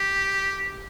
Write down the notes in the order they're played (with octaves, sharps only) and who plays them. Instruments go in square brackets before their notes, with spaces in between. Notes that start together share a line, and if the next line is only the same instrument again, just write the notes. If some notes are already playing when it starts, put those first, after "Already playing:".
Already playing: [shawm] G4